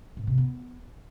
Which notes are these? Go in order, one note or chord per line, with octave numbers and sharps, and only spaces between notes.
G#2
C3
B3